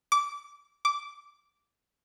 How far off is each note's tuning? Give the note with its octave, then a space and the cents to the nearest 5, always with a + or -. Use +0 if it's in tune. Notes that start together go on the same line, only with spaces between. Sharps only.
D6 -20
D6 -10